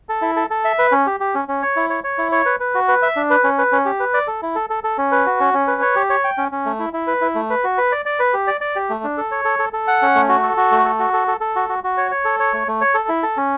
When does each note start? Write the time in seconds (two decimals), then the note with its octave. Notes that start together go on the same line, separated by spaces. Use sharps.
0.09 A4
0.22 E4
0.36 A4
0.50 A4
0.65 E5
0.79 B4
0.92 C#4
1.06 G4
1.20 G4
1.35 C#4
1.48 C#4
1.62 C#5
1.76 E4
1.90 C#5
2.04 C#5
2.18 E4
2.32 C#5
2.46 B4
2.60 B4
2.75 F#4
2.88 B4
3.02 E5
3.16 D4
3.30 B4
3.44 C#4
3.58 B4
3.72 C#4
3.85 G4
4.00 B4
4.14 D5
4.27 A4
4.42 E4
4.55 A4
4.70 A4
4.84 A4
4.98 C#4
5.12 B4
5.26 F#4
5.40 C#4
5.54 C#4
5.67 B4
5.82 C#5
5.96 G4
6.10 C#5
6.24 G5
6.38 C#4
6.52 C#4
6.66 A3
6.79 E4
6.93 E4
7.07 B4
7.21 E4
7.35 A3
7.50 B4
7.64 F#4
7.78 B4
7.92 D5
8.06 D5
8.20 B4
8.33 G4
8.47 D5
8.61 D5
8.76 G4
8.90 A3
9.04 D4
9.18 A4
9.31 C#5
9.45 A4
9.59 A4
9.73 A4
9.88 F#5
10.02 C#4
10.15 A3
10.29 F#4
10.43 A4
10.57 F#4
10.71 A3
10.85 A4
10.99 F#4
11.13 A4
11.28 A4
11.41 A4
11.56 F#4
11.69 F#4
11.84 F#4
11.97 C#5
12.11 C#5
12.25 A4
12.40 C#5
12.53 A3
12.68 A3
12.81 C#5
12.95 A4
13.09 E4
13.23 A4
13.37 C#4